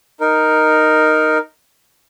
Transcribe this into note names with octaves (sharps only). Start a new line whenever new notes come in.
D#4 A#4